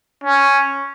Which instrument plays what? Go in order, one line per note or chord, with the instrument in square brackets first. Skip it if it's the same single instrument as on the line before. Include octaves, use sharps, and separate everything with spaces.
[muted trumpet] C#4